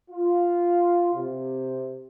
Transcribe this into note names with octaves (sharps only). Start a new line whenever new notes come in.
F4
C3